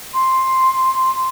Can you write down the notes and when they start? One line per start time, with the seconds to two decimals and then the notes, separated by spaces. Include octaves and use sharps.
0.14 C6